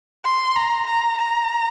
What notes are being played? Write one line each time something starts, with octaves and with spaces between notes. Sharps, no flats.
C6
A#5
A#5
A#5